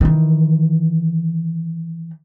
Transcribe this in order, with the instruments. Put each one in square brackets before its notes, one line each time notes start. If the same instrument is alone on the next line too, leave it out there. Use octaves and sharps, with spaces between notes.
[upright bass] D#3 E3